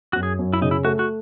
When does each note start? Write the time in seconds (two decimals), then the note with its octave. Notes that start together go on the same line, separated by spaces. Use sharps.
0.13 F#2 F#4
0.23 G#4
0.39 F#2
0.53 E4
0.61 C#3 D#4
0.71 E4
0.84 A3 F#4
0.99 F#4